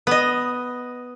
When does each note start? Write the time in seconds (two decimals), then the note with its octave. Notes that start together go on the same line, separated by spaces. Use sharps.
0.07 B3 D#5